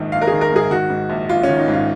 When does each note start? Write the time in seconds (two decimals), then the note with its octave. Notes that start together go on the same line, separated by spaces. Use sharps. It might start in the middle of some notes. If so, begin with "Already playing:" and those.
Already playing: A#1 G#2 D#3
0.12 A#1 F5
0.22 A#4
0.27 G#4
0.32 D#3
0.41 A#4
0.52 G#2 G#4
0.71 D#3 F#4
0.90 G#2
1.09 A#1
1.29 A#1 F4
1.43 C#4
1.49 D#3
1.58 D#4
1.68 G#2
1.73 F4